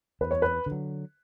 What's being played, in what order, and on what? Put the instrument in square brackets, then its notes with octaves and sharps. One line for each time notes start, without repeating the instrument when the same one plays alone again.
[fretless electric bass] E2 [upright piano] B4
[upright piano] C#5
B4
[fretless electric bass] D3
F#3